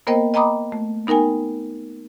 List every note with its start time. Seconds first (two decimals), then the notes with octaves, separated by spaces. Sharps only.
0.07 A#3 B3 A#4 C5 D#5 G5
0.34 D#5 G5 A#5 B5 D6 D#6
0.72 A3
1.07 B3 D#4 A#4 G5 G#5